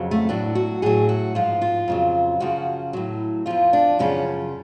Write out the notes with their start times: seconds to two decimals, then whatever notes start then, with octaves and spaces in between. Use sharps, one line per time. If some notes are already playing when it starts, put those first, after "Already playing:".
Already playing: F2 C#3 F#3
0.11 A3
0.29 A2 F#3 D4
0.55 F#4
0.82 A2 F#3 G#4
1.09 F#4
1.35 G#2 F3 F4
1.61 F4
1.88 F2 C#3 F#3
2.40 F#2 C#3 F3 F#4
2.93 A2 F#3
3.46 F2 F3 F4
3.73 D4
3.99 F#2 C#3 F3 C#4